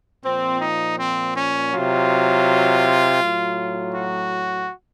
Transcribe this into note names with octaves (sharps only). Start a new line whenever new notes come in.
A#2 F3 C4
D#4
C4
C#4
C3 F#3 F4
A2 F#3
F#4